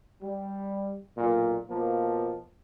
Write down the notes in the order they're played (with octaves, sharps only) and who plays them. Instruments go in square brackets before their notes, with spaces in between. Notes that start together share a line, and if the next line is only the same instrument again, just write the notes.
[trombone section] G3
B1 A#2
B2 F3 A#3